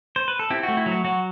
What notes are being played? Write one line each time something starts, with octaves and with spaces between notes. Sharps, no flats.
C5
B4
A4
C4 E4 G4
F#4
A3
E4
F#3
F#4
F#3 F#4